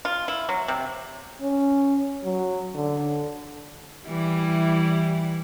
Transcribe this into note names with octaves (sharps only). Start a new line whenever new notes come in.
F4
E4
F#3
C3
C#4
F#3
D3
E3 G3 E4